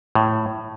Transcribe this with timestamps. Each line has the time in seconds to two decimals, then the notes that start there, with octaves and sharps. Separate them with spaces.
0.15 A2